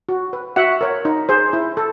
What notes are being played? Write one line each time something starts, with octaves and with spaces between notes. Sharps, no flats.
F#4
B4
F#4 E5 F#5
A#4 C#5
D#4
G#4 C5
E4
A4